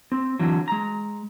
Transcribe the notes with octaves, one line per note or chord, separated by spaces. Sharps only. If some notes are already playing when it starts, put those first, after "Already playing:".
C4
D3 E3 F#3
G#3 A#5